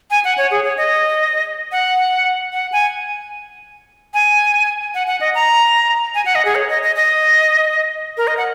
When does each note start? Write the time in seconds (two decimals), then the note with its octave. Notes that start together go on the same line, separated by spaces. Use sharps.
0.11 G#5
0.24 F#5
0.38 C#5
0.51 G#4
0.64 C#5
0.77 D#5
1.72 F#5
2.53 F#5
2.72 G#5
4.14 G#5
4.94 F#5
5.07 F#5
5.21 D#5
5.35 A#5
6.15 G#5
6.25 F#5
6.35 D#5
6.45 G#4
6.55 C#5
6.69 D#5
6.83 D#5
6.96 D#5
8.17 A#4
8.27 D#5
8.37 F#5